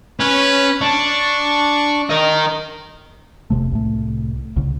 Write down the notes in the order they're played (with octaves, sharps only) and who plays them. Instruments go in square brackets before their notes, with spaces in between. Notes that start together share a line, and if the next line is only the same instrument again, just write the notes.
[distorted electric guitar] C#4 [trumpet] B4
[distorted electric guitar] D4 [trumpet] C#6
[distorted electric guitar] A#4 D#5
[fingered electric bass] F1 C#2 C3 A3
C2 A2 A3
C2 C#3